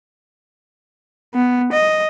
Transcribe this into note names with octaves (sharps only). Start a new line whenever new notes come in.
B3
D#5